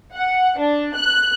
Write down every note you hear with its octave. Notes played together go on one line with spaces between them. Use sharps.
F#5
D4
F#6